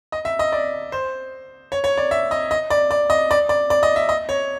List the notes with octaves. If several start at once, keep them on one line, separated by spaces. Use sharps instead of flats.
D#5
E5
D#5
D5
C5
C#5
C#5
D5
E5
D#5
D#5
D5
D5
D#5
D5
D5
D5
D#5
E5
D#5
C#5